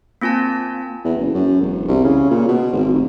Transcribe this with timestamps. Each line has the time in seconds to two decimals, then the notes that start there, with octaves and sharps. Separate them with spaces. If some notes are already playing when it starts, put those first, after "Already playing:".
0.21 A#3 C4 F4 G#5 A5
1.05 E2
1.18 F#1
1.34 F#2
1.61 E1
1.88 C2
2.04 C#3
2.31 A#2
2.48 B2
2.73 G#1
2.93 F1